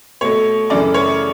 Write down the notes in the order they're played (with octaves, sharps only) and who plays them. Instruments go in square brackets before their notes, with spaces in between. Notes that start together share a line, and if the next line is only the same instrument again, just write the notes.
[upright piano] B2 A3 C#5
F#2 C#3 E3 A3 D5
C#5